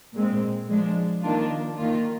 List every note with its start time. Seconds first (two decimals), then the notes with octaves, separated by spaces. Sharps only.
0.13 A#2 G#3 C4
0.68 F3 G#3 D4
1.22 D#3 A#3 D4 F4
1.77 D#3 A#3 F4